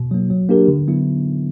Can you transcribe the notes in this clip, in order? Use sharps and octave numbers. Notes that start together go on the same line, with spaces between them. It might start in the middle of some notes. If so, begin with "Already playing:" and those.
Already playing: B2
F#3 A#3
F#3
A#3 D4 G4 A#4
D3
F#3 B3 E4